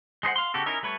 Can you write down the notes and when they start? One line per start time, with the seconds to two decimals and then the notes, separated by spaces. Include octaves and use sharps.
0.23 G#3 D#4 C5 F#5
0.36 F5 C6
0.54 C#3 F#4 G4 A4
0.66 C#4 D#4 E4 A#4
0.83 G3 A3 B4 C#5